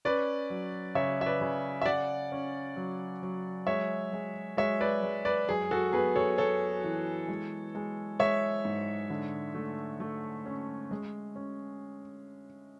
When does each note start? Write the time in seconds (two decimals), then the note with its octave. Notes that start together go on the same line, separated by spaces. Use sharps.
0.05 C#4 B4 D5
0.50 F#3
0.95 C#3 C#5 E5
1.21 E5
1.26 B4 D5
1.41 C#3
1.82 E5
1.86 C#3 D5 F#5
2.32 C#4
2.76 F#3
3.22 F#3
3.67 G#3 C#5 E5
4.13 G#3
4.57 G#3 C#5 E5
4.81 B4 D5
5.03 G#3
5.25 B4 D5
5.49 F#2 G#4
5.71 F#4 A4
5.93 B3 G#4 B4
6.16 A4 C#5
6.38 B3 A4 C#5
6.84 E3
7.28 G#3
7.75 G#3
8.19 G#3 C#5 E5
8.65 G#2
9.10 D3
9.55 A3
10.00 A3
10.46 C#4
10.91 G#3
11.36 C#4